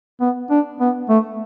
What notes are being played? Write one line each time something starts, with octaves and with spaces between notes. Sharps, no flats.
B3
D4
B3
A3